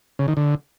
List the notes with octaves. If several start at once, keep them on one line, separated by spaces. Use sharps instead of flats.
C#3
D#3
D3